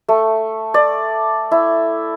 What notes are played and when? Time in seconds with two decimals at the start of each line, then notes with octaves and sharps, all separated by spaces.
0.08 A3
0.74 D5
1.51 E4